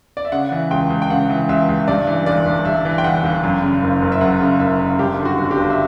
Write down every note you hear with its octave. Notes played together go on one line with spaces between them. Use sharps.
D5
E5
C#3 F#5
E3
C#2 G5
C#2
G5
C#3 F#5
E3
C#2 E5
C#2
G2 D5
E3
G1 D5
G1
G2 E5
E3
G5
G1 F#5
G1
F#2
C#3
F#1
F#1
E5
F#2 F#5
C#3
F#1 E5
F#1
G2 G4
D3
F#4
G1
G4
G1
E5